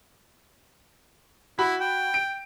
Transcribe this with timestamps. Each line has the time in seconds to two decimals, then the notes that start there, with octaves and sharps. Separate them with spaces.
1.59 E4 F#4 B5
1.81 G5
2.14 D7